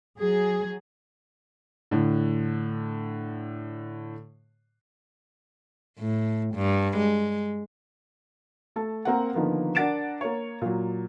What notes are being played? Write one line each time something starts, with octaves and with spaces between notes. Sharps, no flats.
F#3 G#4
A2 D3
A2
G2
G#3
A3 A4 A5
A#3 C4 A#4 F5 F#5
D3 D#3 F3 A#3 B3
D4 A#4 F#5 A6 D7 E7
A#3 C#5
A#2 F#3